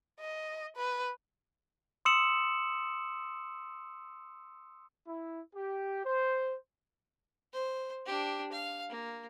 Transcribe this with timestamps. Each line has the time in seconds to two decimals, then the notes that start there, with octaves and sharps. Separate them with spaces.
0.20 D#5
0.77 B4
2.05 C6 D#6 E6 C#7 E7 F#7
5.08 E4
5.56 G4
6.05 C5
7.53 C5
8.06 D4 G4
8.52 F5
8.90 A#3